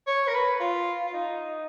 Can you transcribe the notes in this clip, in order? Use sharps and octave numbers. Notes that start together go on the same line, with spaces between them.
C#5
A#4
B4
F4
F4
D#4